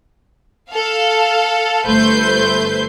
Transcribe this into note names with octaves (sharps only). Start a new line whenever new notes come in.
A4 F5
G1 A3 B4 C5 C6 G6